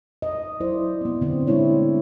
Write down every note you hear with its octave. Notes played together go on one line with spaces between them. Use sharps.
D#5
F#3 E4 C5 D5
B3 C4
D3 C4
G#3 A3 D4 E4 C#5